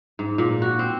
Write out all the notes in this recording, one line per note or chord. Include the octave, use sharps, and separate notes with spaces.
G#2
A#2
F#4
C4